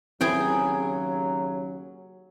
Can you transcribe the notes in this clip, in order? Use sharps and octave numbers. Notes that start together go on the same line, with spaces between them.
D#2 C#3 F#3 C4 E4 G#4 B4 G5